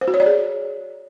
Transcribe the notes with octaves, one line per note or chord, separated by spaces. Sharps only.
C5
F#4
C#5
D5
G#4